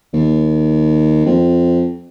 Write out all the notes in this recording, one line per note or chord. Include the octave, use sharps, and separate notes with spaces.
D#2
F2